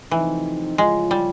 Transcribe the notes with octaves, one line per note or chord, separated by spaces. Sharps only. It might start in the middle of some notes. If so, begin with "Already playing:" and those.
C3 E3 F3 A3 C4 D#4
C#3 F3 G#3 A3 C#4 F4
G3